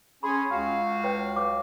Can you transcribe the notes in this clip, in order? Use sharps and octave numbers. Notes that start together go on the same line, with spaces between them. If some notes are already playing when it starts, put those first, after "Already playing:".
C#4 G#4 B5 C6
C#2 C#4 F#4 F5
B4 C#5 G5
B4 C#5 D6